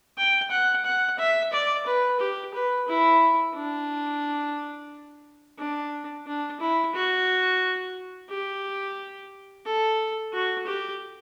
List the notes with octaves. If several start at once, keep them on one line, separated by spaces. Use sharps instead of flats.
G5
F#5
F#5
E5
D5
B4
G4
B4
E4
D4
D4
D4
E4
F#4
G4
A4
F#4
G4